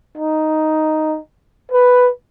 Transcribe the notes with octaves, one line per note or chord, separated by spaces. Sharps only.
D#4
B4